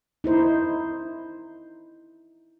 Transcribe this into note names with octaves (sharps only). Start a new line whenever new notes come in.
D#4 E4 C5